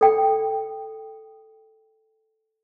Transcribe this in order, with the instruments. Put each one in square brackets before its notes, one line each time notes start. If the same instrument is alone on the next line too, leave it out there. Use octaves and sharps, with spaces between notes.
[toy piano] A4 G5